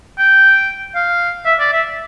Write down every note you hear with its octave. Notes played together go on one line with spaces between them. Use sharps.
G5
F5
E5
D5
E5